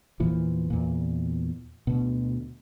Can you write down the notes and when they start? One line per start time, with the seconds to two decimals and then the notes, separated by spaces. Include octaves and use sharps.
0.20 E2 A#2 E3 F3
0.70 E2 A#2
1.87 D2 B2